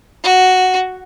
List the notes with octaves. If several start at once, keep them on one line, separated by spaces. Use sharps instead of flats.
F#4